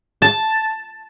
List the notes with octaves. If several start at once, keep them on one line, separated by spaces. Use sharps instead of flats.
A5